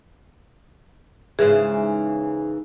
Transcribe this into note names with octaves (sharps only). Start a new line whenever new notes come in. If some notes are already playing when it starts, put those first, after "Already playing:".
G#2 C#3 E3 G#4